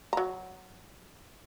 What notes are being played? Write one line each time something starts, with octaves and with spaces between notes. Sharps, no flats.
F#3 A#5